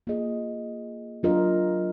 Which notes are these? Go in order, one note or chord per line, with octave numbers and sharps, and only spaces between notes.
A#3 F4 G#4 D#5
F#3 D4 F4 A#4 D#5